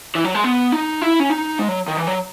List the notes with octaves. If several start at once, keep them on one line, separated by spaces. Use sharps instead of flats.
E3
F#3
G#3
B3
D#4
E4
C#4
D#4
G#3
F#3
D#3
E3
F#3